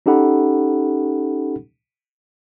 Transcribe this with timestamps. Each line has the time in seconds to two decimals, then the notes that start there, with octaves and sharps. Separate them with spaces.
0.06 C#4 D#4 G4 A4 F#5 B5